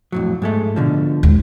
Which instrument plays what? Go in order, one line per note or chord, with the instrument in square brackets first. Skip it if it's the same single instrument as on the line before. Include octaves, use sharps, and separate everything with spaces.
[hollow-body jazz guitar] F2 A2 F#3
G#2 G#3 A3
B2 D3 F3
[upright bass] D#2 G#3